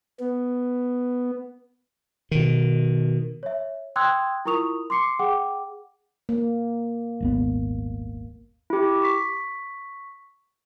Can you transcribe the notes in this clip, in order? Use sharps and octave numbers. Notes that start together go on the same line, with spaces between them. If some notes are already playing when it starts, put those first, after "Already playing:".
B3
B2 D#3
C#5 E5
G5 C6 D#6 E6 F#6 G#6
E4 F4 A#4 C#6 D#6 F7
C6 D6 C7 C#7
G#4 F#5 G5 D6
A#3
D#1 G#1 B3
E4 G4
C#6 B6